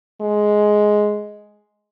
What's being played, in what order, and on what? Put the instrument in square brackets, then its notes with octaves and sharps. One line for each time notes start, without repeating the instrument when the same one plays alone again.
[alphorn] G#3